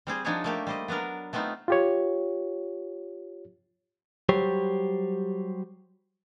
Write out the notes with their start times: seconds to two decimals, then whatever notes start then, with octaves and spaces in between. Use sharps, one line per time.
0.07 G3 C4 G#4 C5
0.25 F3 D4 D#4 F#4 G#4 C#5
0.44 A3 A#3 G4
0.67 G3 C5 D#5
0.88 F#3 B3 D4 A#4
1.33 A3 B3 C4 D#4 F4
1.68 F4 G4 C#5
4.29 F#3 G3 G4 C5 C#5